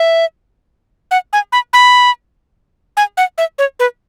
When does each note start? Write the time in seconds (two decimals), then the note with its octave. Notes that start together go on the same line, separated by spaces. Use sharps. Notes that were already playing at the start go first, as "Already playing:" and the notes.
Already playing: E5
1.11 F#5
1.33 G#5
1.52 B5
1.73 B5
2.97 G#5
3.17 F#5
3.38 E5
3.58 C#5
3.80 B4